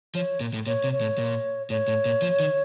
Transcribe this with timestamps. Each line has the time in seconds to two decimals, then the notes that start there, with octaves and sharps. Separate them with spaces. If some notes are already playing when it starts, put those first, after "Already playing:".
0.15 F3 C#5
0.40 A#2
0.54 A2
0.66 A#2 C#5
0.84 C3
0.93 C#5
1.01 A2
1.18 A#2
1.70 A2 C#5
1.88 A2
2.05 A#2
2.22 F3
2.40 D#3